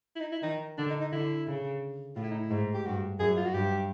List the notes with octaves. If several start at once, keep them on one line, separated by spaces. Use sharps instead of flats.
E4
D#4
E4
D#3 D#4
D3 D4
D#4
D#4
D3 E4
C#3
A2 F4
E4
D#4
E4
G#2
G4
G2 F#4
F#2 G#4
F4
F#4
G2 G4